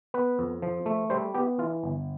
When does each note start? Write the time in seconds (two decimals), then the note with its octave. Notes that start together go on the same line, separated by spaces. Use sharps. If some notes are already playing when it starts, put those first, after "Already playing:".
0.14 B3 B4
0.39 F2
0.62 F3
0.86 A3
1.10 G3 C5
1.34 B3 G4
1.58 E3 F4
1.83 G1